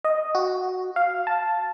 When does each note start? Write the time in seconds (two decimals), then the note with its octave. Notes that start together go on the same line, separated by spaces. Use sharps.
0.04 D#5
0.35 F#4
0.96 F5
1.27 A5